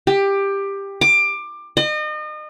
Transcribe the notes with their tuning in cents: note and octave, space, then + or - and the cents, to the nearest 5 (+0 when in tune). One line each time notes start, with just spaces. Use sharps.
G4 +15
D6 +20
D#5 -35